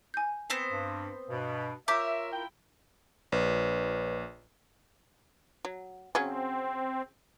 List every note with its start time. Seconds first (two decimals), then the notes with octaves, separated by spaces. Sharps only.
0.14 G#5 G6
0.50 B3 C4 C5
0.72 G2
1.29 G2 B2
1.88 F4 A#4 C#5 E5 D6 G6 B6
2.32 E4 F4 G5
3.32 A#1 B4 C#5
5.65 F#3
6.15 C#3 F#3 C4 C#4